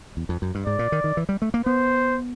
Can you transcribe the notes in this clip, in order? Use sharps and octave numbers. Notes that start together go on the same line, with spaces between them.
E2
F2
F#2
G2
G#2 D5
A#2
D#3
D#3
E3
G3
A3
A#3
B3 C5